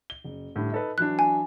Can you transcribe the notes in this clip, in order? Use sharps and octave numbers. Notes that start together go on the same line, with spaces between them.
G7
F#1
A2 D3 G3
D#4 A4 B4
E3 F#3 D4 F#6
G#5